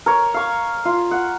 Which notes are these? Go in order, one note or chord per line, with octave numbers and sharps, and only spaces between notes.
A#4 C#5
F5 C#6
F4
F#5